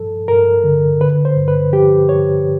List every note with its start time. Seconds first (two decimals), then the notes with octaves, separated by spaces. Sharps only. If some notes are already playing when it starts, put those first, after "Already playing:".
Already playing: G2 F3 A4
0.28 G2 A#4
0.64 D3
1.01 D3 B4
1.25 C5
1.37 G2
1.48 B4
1.72 F3 G4
2.08 G2 C#5